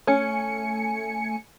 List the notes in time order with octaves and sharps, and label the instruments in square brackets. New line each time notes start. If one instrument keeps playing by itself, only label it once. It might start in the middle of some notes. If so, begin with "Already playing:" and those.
[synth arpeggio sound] A3 G#5 C#7 [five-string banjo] C#4